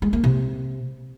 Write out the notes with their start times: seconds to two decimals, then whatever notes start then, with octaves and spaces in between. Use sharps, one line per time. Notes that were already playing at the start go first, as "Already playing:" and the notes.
0.02 G#3
0.13 A#3
0.24 C3